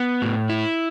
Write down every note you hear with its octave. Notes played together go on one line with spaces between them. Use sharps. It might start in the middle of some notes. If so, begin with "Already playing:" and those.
Already playing: B3
A2
E4